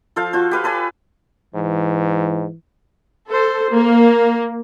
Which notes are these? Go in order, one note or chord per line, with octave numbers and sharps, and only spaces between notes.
F3 A4 C5 F5
F4 F#4 C5
G4 B4 F5
A4 B4 C#5 G#5
G#2 E3
A4 C5
A#3